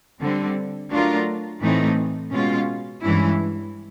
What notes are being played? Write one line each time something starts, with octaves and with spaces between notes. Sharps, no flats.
D3 G3 C4
F#3 A3 D4 F4 A#4
A2 E3 A3 C4 D#4
B2 G#3 C#4 F4
G2 E3 G#3 C#4 E4